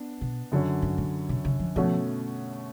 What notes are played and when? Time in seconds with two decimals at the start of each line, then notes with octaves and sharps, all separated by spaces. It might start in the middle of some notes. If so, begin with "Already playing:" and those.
Already playing: B3 D4
0.21 B2
0.52 F#2 D3 F#3 C#4
0.82 G#2
0.98 A2
1.29 B2
1.45 C#3
1.60 F3
1.76 B2 F3 A3 C#4 F#4